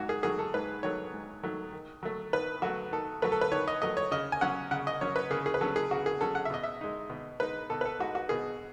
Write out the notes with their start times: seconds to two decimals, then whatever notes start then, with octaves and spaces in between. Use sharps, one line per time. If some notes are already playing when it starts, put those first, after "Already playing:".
Already playing: G#2 F#3 F#4
0.09 G#4
0.23 D#3 F#3 A3 G#4
0.39 A4
0.54 G#2 B4
0.83 D#3 F#3 A3 C#5
1.14 G#2
1.43 D#3 F#3 A3
1.72 D#3
2.03 F#3 A3
2.33 D#3 B4
2.62 F#3 A3 F#4
2.92 D#3 A4
3.22 F#3 A3 B4
3.32 A4
3.41 B4
3.52 D#3 C#5
3.68 D#5
3.82 F#3 A3 D#5
3.97 C#5
4.11 C#3 D#5
4.32 G#5
4.41 F#3 C#4 F#5
4.71 C#3 F#5
4.87 D#5
5.01 F#3 C#4 C#5
5.16 B4
5.31 C#3 G#4
5.46 G#4
5.54 B4
5.61 F#3 C#4 A4
5.76 G#4
5.91 C#3 F#4
6.06 G#4
6.21 F#3 C#4 A4
6.35 F#5
6.45 E5
6.50 B2 D#5
6.63 E5
6.81 G#3 D#4
7.10 B2
7.40 G#3 D#4 B4
7.70 B2 A4
7.81 B4
7.85 A4
7.99 G#3 D#4 F#4
8.15 F#4
8.29 B2 G#4